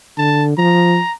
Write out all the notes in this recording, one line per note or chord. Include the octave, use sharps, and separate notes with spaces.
D3 A5
F3 A#5